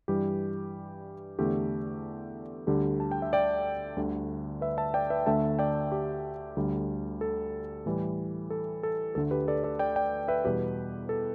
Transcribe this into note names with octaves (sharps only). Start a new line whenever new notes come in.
G2 E3 G3 G4
E2 D3 A3 G4
D2 D3 G3 G4
A5
G5
E5
D5 G5
D2 D3 G3
B4 E5
E5 A5
D5 G5
B4 E5
D2 D3 A3 E5 A5
D5 G5
G4
D2 D3 G3
A4
A2 E3 G3
A4
A4
D2 D3 A3 A4
G4 B4
A4 D5
A4 D5
D5 G5
D5 G5
B4 E5
E2 B2 G3 G4 B4
A4